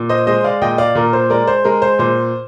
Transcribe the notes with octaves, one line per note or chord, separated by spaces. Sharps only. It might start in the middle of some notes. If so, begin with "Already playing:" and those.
Already playing: A#2
C5 D#5
G#3 C5 D#5
D5 F5
A#2 D#5 G5
D5 F5
A#2 A#4
C5
G#3 A#4 D5
C5
G#3 A#4
C5
A#2 C5